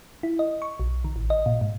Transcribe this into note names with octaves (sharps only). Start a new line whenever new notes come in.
E4
D#5
C#6
B1
D#3
A1
D#5
A#2
G#2